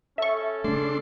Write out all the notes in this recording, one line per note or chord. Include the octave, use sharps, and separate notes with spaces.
C#4 A4 E5 C#6
C#3 A3 D4 C6